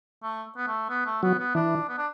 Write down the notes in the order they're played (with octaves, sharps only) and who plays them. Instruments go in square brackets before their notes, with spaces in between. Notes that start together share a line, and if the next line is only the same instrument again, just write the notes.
[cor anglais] A3
B3
A3
B3
A3
[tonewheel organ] F#3 [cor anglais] B3
[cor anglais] B3
[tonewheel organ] E3 [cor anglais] D4
[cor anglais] B3
D4